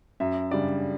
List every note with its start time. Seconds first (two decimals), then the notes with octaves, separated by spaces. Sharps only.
0.20 F#2 E5
0.51 C#3 G3 D4 D5